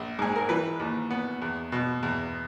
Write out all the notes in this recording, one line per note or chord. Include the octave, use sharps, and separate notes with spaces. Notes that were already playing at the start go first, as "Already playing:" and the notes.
Already playing: A#1
G#2 G#4
A#4
E3 B4
D#2
B3
E2
B2
E2